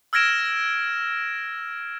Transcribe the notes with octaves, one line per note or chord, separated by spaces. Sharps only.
E6 F6 G#6 A#6 D7 E7